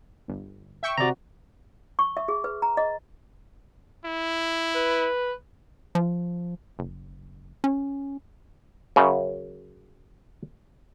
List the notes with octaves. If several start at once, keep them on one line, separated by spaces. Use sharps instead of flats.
G1
E5 G5 C#6
C3 F#4 D5 A#5
C#6
E5
G#4
B4
A#5
D#5
E4
B4
F3
F#1
C#4
F#2 C#3